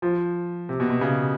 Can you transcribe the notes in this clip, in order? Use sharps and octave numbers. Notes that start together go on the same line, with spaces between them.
F3
C3
B2
B2
C#3